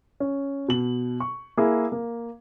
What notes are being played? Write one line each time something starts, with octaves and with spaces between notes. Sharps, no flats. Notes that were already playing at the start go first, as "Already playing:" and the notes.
C#4
B2 F#7
C#6
A#3 E4 G#4
A#3